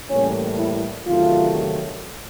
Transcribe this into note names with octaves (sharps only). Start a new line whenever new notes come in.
A2 E3 G3 A#3 C#4
E4
E2 C3 D#3 F#3 A3 F4